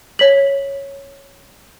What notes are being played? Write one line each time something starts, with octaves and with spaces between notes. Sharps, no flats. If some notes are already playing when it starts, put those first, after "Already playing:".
C#5 B6 F#7